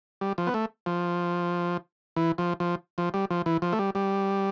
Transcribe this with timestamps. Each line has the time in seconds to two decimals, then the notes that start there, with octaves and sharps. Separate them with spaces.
0.21 G3
0.38 F3
0.47 B3
0.54 A3
0.86 F3
2.16 E3
2.38 F3
2.60 F3
2.98 F3
3.14 G3
3.30 F3
3.46 E3
3.62 F3
3.73 A3
3.79 G3
3.95 G3